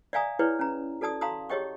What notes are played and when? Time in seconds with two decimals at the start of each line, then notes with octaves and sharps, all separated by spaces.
0.13 D5 E5 F5 G#5 A#5 D#6
0.39 E4 G#4 B4 C#5 D5
0.59 C#4 A#5
1.01 F#4 A4 D5 A5 D#6
1.21 F5 A5 A#5 C6 D#6
1.50 G4 G#4 C#5 D#5 G5 C#6